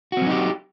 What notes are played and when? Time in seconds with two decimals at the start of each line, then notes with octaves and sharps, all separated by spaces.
0.12 F#4
0.17 C4
0.22 F#3
0.26 D#4
0.31 G4